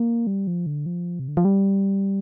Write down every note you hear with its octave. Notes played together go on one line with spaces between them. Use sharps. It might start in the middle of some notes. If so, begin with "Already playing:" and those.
Already playing: A#3
G3
F3
D3
F3
C3
D3
F3
G3